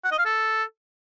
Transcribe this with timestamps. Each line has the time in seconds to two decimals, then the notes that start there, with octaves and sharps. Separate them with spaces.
0.05 F#5
0.12 D#5
0.19 F5
0.26 A4